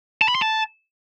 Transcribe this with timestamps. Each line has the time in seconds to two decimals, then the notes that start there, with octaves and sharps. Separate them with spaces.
0.21 A5
0.28 B5
0.35 C6
0.42 A5